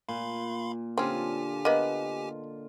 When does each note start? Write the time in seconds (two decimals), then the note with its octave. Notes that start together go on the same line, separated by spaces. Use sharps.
0.09 A#2 F5 B5 C6
0.98 D3 C4 C#4 F4 G4 G#5
1.65 A#3 B3 D#5